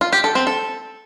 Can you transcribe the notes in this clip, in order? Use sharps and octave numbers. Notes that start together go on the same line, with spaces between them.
F4
G4
A4
C4
A4